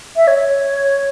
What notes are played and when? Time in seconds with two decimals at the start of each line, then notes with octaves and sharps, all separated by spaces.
0.16 E5
0.28 C#5